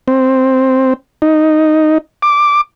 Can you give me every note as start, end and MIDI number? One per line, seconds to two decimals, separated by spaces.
0.08 0.93 60
1.22 1.98 63
2.22 2.61 86